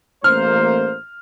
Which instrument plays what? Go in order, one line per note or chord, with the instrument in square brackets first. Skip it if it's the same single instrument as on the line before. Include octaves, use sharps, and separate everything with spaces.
[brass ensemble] A1 A#3 C5 [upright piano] F6